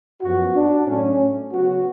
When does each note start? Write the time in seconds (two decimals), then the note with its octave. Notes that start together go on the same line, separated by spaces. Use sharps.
0.21 F#2 F3 B3 F#4
0.55 D4
0.86 A2 F#3 A3 C#4
1.51 C#3 F#3 B3 F#4